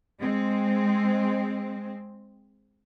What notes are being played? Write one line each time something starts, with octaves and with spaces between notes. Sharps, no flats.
G#3 C4